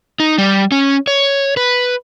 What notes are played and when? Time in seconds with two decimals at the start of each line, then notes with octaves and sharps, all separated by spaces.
0.20 D#4
0.38 G3
0.72 C#4
1.07 C#5
1.57 B4